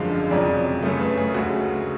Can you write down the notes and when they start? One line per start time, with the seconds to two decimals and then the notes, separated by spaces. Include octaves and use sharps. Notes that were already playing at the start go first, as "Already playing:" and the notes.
Already playing: G#1 F#2 D3 F3 G#3 F5
0.30 F1 F2 C#3 F#3 D5
0.83 F#2 C#3 F#3 A3
1.00 B4
1.17 G#4
1.34 D2 C#3 G#3 F#4